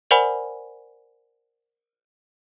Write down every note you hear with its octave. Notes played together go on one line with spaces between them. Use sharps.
A#4 C5 D5 F#5 G#5 B5